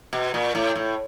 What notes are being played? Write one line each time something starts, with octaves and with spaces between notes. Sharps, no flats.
B2
A#2
A2
A2